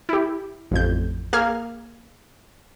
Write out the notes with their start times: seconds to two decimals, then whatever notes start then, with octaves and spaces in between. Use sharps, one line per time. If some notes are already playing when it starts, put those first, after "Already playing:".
0.09 E4 G4
0.71 A1 F2 G6
1.33 A#3 G#4 F6 G#6